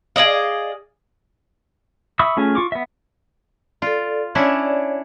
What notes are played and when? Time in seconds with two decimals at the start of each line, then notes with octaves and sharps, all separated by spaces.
0.16 G#4 D5 D#5 F5
2.19 E5 B5 C#6 D#6 E6
2.37 A3 C#4 F4 G#4
2.55 F4 C#6 D6
2.72 B3 E5
3.82 F4 A4 D5
4.35 C#4 D4 E4 C#5 D5